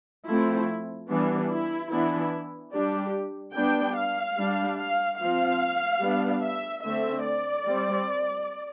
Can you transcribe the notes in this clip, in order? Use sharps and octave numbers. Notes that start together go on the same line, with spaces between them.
F3 A3 C4 E4
E3 G3 B3 D4
E4
E3 B3 D4 E4
G3 D4 G4
G3 B3 D4 G5
F5
G3 D4
F5
F3 C4 F5
G3 B3 D4
E5
D3 A3 C4 E5
D5
G3 C4